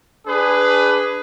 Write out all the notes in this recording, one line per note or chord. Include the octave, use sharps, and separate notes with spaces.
D4 G#4 B4